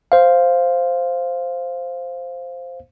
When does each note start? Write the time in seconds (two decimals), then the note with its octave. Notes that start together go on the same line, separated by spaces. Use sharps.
0.12 C5 F5